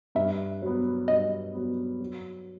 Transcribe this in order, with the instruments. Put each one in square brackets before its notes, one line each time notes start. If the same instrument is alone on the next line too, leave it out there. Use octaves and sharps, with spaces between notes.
[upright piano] G2 [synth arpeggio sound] E5
[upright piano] F#3 B3
[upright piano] G2 [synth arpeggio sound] D#5
[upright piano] F#3 B3
F#3